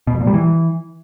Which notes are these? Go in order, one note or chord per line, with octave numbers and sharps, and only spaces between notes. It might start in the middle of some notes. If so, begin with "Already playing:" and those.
B2
F2
A#2
G3
E3